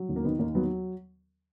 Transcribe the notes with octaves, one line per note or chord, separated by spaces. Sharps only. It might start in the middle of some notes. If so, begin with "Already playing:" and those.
Already playing: F#3
D#2
A#3
D#3 B3
D#2 A#3
F#3 B3